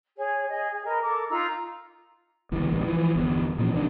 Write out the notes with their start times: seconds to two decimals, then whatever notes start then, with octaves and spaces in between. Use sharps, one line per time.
0.17 G#4 C#5
0.49 G#4 D#5
0.71 G#4
0.85 A#4 B4 D#5
1.02 A4 A#4 D6
1.30 D#4 F4 A#5 E6
2.52 G1 C#2 E3
2.71 A1 G2
2.84 E3 F3
3.16 G1 E2
3.58 A#2 E3 F3 C#4
3.74 C#2 D#3 C4 D4